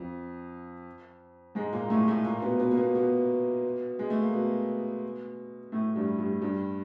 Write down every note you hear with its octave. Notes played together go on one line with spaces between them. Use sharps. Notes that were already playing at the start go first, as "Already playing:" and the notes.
Already playing: F2 F3
G#2 G#3
A#2 A#3
A2 A3
A2 A3
A#2 A#3
B2 B3
B2 B3
A#3
B2 B3
B2 B3
G#3
A3
A#3
B2 B3
A2 A3
G2 G3
G2 G3
G2 G3